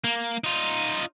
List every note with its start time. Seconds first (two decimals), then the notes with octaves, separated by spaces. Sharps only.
0.04 A#3
0.44 D#4 F4